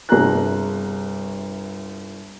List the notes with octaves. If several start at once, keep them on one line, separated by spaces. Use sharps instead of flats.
G1 C2 G#4 A#5 F#6